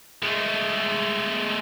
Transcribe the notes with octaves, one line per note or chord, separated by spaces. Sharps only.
G#3 A3